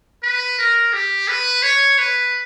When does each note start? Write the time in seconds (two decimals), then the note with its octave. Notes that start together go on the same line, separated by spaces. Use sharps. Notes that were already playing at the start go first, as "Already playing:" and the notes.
0.23 B4
0.58 A#4
0.93 G4
1.28 B4
1.63 C#5
1.98 B4